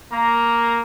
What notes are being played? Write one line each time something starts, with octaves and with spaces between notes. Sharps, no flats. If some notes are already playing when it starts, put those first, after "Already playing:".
A#3 A#5